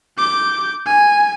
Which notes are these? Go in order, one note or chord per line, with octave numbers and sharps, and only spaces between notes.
D6 G6
G#5